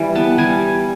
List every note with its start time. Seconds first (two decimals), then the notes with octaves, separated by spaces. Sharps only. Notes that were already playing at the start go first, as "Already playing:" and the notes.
Already playing: E3 G3
0.15 B3 A5
0.38 G3 G#5